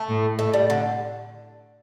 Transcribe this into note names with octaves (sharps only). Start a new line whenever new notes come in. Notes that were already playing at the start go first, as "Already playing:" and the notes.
Already playing: A3
A2
A2 A3
G3
D3